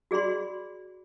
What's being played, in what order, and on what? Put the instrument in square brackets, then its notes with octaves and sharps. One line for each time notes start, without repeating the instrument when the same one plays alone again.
[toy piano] F#4 G#4 D5 B5 C6